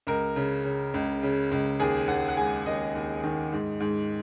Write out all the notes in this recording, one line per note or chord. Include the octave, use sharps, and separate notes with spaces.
C#2 A#4
C#3
C#3
C#2
C#3
C#2
D#2 G#4
D#2 F#5
F#5
G#3 G#5
D#2 D#5
D#2
D#3
G#2
G#2